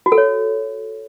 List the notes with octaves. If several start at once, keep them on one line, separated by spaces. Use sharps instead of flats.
F#4
A4
C#5